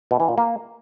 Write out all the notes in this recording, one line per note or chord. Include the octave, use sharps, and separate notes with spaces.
B2
E3
A#2
A#3